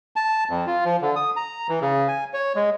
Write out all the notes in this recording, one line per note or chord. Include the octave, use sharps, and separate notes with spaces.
A5
F2
F4
F3
D3
D#6
A#5
E3
C#3
G#5
C#5
G#3